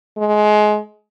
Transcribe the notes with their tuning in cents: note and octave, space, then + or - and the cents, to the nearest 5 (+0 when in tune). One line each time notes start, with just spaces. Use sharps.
G#3 +25